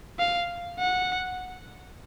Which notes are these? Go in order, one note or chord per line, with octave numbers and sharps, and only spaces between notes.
F5
F#5